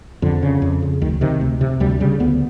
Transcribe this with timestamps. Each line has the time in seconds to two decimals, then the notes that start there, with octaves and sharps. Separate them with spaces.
0.22 F2 D3
0.42 C#3
0.62 F2
0.82 C#3
1.02 D2 D#3
1.21 C3 D#3
1.41 D2
1.61 C3
1.80 D2 G3
2.00 C#3 G3
2.20 D2 B3